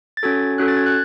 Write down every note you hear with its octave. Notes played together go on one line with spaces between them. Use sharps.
A6
C#4 F#4 A4 G#6
C#4 F#4 A4 F#6
A6
G#6
F#6